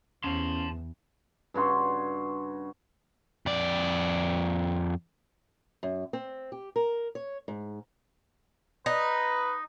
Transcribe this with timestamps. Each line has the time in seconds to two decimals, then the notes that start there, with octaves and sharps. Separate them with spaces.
0.24 E2 C#4 C5 A5 C6
1.54 G2 C#3 F#4 C6
3.46 F2 D5
5.83 F#2
6.13 C4
6.52 G4
6.76 A#4
7.15 C#5
7.48 G#2
8.86 D#4 B4